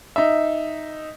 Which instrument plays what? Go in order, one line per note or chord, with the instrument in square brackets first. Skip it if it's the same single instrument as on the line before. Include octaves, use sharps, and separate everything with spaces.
[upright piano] D#4 E5